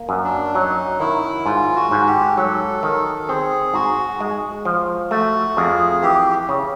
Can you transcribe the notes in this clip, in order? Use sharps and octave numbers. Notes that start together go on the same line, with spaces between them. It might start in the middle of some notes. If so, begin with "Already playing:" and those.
Already playing: A#3
F#2
D4
F#3 D#4
D#3 E4
G#2 F4
F#4
G#2
G4
F#3 A4
D#3
C4 G#4
G#2 F#4
G#3
F3
A3 F#4
F2 G#4
E3 G4
C#3